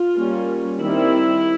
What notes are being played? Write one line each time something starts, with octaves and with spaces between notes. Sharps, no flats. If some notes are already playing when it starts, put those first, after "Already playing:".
Already playing: F4
G3 A#3 C#4
D#3 G3 C4 E4